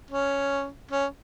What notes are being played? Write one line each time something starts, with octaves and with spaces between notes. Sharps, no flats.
C#4
C#4